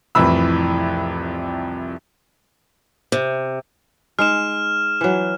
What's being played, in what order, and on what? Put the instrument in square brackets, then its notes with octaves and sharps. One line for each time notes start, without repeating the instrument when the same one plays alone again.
[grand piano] C2 F2 A2 E3 B5 E6
[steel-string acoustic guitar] C3
[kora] G#3 D#4 [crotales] F6 E7
[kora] E3 F#3